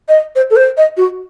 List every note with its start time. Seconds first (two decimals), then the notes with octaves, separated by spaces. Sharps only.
0.08 D#5
0.35 C5
0.50 A4
0.56 C5
0.77 D#5
0.97 F#4